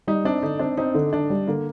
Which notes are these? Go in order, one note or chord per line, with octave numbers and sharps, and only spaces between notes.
G3 D#4
C4 D4
D3 D#4
C4 D4
C4 D#4
D3
D3 D4
G3
D3 A#3